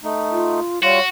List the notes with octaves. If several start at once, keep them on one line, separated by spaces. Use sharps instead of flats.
A3 D#4
F4
G3 F4 F#4 C#5